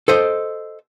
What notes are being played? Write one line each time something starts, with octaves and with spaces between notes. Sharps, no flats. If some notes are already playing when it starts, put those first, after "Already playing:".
A4 C5 D#5